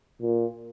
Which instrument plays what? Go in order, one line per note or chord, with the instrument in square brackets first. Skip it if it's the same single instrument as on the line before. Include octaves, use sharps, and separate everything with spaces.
[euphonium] A#2